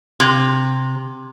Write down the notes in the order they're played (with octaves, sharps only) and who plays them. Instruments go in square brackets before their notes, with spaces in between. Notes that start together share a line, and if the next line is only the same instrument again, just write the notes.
[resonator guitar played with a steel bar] C3